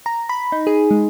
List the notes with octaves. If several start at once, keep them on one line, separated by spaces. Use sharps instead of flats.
A#5
B5
D#4
G#4
G#3